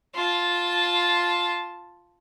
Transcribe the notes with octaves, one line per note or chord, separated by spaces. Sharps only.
F4 A5